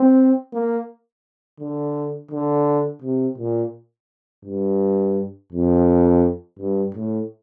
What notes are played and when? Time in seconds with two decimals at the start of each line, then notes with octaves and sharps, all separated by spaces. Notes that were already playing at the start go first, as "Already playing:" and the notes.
Already playing: C4
0.53 A#3
1.60 D3
2.32 D3
3.02 C3
3.38 A#2
4.45 G2
5.52 F2
6.59 G2
6.95 A2